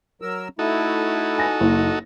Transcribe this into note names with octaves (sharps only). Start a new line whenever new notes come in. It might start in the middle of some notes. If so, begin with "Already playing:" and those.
F#3 A#4 E6
A3 D#4 E4 F#4 A4
G#5 A#6
F#1